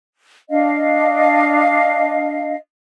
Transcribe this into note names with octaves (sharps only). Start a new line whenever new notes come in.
D4 D#5 F5